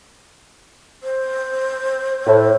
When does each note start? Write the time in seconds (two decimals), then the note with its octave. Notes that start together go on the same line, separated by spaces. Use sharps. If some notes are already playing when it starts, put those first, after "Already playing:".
1.03 C5
2.26 A2